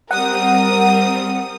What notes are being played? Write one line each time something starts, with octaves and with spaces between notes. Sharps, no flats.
G3 C4 A#4 F#5 D#6